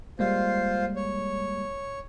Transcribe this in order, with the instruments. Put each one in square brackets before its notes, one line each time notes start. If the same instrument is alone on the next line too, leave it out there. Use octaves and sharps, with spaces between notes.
[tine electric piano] G3 G#3 A#3 [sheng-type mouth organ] F4 C5
[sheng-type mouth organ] C#5